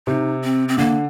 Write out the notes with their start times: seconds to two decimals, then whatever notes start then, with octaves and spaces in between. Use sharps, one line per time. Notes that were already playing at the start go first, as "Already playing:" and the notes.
0.07 C3 D#4
0.44 C4
0.68 C4
0.78 D3 A#3